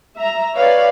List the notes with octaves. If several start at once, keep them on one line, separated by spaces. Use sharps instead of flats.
E5 A#5
B4 C#5 D5 F5